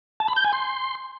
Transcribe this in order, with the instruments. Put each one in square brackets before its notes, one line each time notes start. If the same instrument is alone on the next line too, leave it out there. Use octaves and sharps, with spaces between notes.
[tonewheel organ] A5
B5
G6
G#5
C6